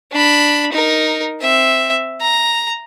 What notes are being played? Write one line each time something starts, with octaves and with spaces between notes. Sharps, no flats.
D4 B5
D#4 A#4
C4 E5
A#5